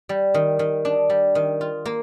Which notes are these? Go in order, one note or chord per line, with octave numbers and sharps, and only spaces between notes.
G3
D#3
D#3
D4
G3
D#3
F4
A#3